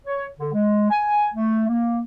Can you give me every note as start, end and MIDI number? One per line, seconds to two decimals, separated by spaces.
0.07 0.27 73
0.39 0.51 50
0.54 0.90 56
0.91 1.28 80
1.35 1.66 57
1.68 2.02 58